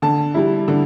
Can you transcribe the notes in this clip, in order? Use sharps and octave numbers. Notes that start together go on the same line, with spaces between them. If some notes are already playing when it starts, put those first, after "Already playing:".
D3 A5
G3 E4
D3